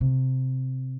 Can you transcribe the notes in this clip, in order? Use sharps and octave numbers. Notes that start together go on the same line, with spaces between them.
C3